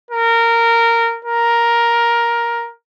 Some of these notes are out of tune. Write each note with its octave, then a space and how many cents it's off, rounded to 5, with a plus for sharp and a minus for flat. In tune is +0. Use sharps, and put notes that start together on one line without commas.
A#4 -15
A#4 +10